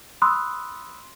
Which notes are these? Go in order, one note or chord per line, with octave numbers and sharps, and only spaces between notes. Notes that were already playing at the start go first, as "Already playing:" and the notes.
B5 C6 D#6 E6 F#6